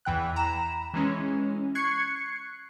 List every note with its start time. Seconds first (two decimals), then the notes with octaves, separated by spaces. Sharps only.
0.05 E2 E3 G5 F#6
0.36 A#5 B5 E7
0.94 E3 G#3 C#4
1.75 C#6 F#6 G#6 C7 C#7